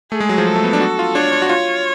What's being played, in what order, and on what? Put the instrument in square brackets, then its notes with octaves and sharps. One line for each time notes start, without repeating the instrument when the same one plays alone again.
[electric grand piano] A3 [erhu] G#4
[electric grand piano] G#3
F#3
F3
[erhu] A4
[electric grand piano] A3
B3
D4
F#4
F4
[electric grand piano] D4 [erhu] C#5
[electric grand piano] D4
F#4
[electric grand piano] F4 [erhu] C#5